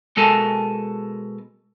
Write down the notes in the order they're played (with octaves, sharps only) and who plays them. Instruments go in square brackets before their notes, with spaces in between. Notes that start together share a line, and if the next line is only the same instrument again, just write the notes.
[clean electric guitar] B2 G#3 A4 A#4 G#5 A5